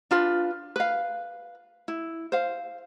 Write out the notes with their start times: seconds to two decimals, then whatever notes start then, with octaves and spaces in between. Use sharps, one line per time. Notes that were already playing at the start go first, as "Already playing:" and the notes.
0.11 D4 F4 B4
0.76 B4 F5
1.88 E4
2.32 C5 F5